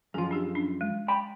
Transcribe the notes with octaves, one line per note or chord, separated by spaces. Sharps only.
F#2 F3 G#4 F5
D4 G4 G#4
C#4 D4
G#3
G5 B5